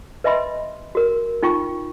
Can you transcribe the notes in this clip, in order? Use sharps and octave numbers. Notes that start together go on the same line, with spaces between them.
B4 D#5 E5 G#5 B5 C6
F#4 A#4
D#4 F4 G5 C#6